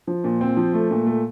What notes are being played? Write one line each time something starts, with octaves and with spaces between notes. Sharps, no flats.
F3
A#2
C4
F3
A3
A#2
A3